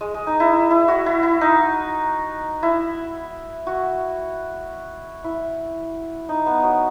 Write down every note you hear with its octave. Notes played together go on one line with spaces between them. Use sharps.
G#3
G#3
D#4
E4
E4
E4
F#4
E4
E4
D#4
E4
F#4
E4
D#4
B3
F#3